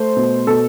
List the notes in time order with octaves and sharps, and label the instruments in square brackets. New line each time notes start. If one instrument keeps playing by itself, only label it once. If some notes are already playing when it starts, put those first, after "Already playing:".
Already playing: [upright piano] A3 C5
B2
B2 A4